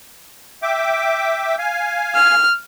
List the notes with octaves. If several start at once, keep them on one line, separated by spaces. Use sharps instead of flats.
E5 G5 D6
F5 G#5
F6